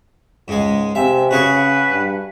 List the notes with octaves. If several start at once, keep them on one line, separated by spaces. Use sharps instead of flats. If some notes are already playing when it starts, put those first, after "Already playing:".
C#2 G#2 G#3
C3 E5 F5 G#5
C#3 F#4 G#4 B4 C#6
G2